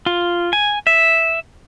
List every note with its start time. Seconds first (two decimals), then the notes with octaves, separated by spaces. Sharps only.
0.06 F4
0.53 G#5
0.87 E5